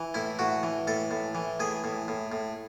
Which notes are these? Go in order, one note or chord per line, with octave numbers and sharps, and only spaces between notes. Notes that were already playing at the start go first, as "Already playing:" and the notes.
Already playing: E3
A2 E4
A2 F#4
E3
A2 A4
A2
E3
A2 G#4
A2
A2
A2